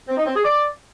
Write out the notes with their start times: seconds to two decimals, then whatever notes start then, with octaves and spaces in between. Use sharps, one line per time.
0.08 C4
0.17 D#4
0.26 C4
0.35 G#4
0.44 D5